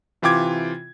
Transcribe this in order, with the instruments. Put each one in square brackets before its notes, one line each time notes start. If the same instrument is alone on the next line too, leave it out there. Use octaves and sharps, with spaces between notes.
[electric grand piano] C3 E3 F4 G5 D6 G#6